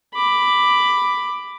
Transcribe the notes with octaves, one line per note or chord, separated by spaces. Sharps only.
B5 D6